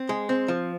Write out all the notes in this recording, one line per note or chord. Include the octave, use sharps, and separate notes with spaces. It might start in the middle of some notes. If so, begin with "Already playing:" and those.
Already playing: C4
G#3
C4
F3